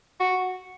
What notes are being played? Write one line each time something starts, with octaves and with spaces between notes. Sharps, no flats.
F#4